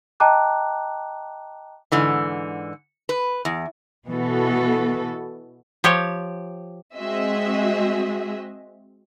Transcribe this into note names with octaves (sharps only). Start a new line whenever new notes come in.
D#5 G5 A5 A#5 D6 F#6
G#2 D3 E3
B4
E2
B2 E3 B3 F#4 A4
F3 G4 C#5
G#3 C4 F#4 G#4 D#5 E5